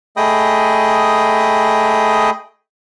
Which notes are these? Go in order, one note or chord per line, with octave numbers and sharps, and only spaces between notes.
A3 G#4 D#5 G5 B5 D#6